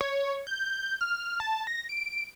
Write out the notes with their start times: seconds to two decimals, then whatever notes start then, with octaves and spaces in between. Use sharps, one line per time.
0.01 C#5
0.47 G6
1.01 F6
1.40 A5
1.67 A#6
1.89 D7